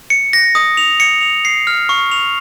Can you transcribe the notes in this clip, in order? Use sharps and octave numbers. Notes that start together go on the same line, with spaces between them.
C#7
A#6
D#6
F7
C#7
F7
C7
F6
C#6
F7